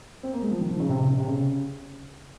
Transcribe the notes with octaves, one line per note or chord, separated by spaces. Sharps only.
C4
A#3
G#3
F3
D#3
F3
C#3
C3
C3
C#3
C3
C#3